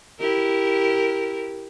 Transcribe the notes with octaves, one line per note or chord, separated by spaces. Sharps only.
E4 G4 A#4